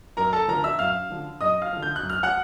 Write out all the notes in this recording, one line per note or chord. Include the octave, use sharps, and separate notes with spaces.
F#2 A#4 A#5
A4 A5
D3 F3 A#4 A#5
E5 E6
F#2 F5 F6
D3 F3
F#2 D#5 D#6
F5 F6
D3 F3
G6
F#6
F#2
F6
F#5 F#6